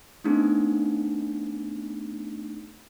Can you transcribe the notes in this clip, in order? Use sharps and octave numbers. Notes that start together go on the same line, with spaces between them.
A3 B3 C4 D4 D#4 G#4